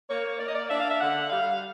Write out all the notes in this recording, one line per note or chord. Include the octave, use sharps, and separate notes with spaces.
A#3 C#5
A#3 D5
D#5
D5
D4 E5
F5
E5
D3 F#5
G3 F5